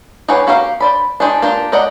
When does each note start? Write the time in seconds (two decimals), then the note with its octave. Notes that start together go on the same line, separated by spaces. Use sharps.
0.28 G4 G#4 B4 C#5 F#5
0.47 A#3 F#4 G4 A#4 F5
0.80 C5 D5 B5
1.20 D4 D#4 G4 G#4 C5
1.42 A#3 D4 F4 G4 A#4
1.72 G4 A#4 D5 D#5 F#5